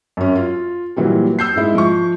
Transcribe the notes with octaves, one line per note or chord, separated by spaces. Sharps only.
F#2 C#4
F4
A#2 E3 F#3 G3
E6 G6 C7
G#2 G#3 E4
F3 C#6